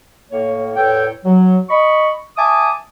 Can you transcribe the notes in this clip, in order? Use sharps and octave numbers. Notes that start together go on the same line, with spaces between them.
A2 A#3 C#5
E2 A2 A4 C#5 G5
F#3
D#5 B5 C#6
E5 G#5 A5 D6 D#6